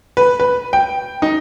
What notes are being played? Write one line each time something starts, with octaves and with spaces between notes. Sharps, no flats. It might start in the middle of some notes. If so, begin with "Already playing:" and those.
B4
B4
G5
D#4